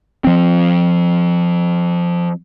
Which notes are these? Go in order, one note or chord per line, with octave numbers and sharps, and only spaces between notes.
F3 C4